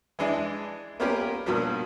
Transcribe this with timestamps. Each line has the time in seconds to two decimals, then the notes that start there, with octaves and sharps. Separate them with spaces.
0.19 E3 G#3 D4 E4
1.00 A#3 B3 C#4 F4 G4 A#4
1.46 G2 B2 F3 F#3 A#3 B3